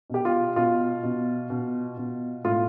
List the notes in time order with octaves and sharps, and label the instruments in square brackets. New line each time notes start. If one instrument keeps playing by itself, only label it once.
[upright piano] B2 G4
F4
B2 F4
B2
B2
B2
A2 F4